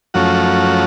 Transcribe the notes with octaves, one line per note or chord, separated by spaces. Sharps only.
F#2 F3 A3 C#4 F#4